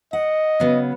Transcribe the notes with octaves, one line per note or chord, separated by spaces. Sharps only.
D#5 F#5
C#3 F#3 B3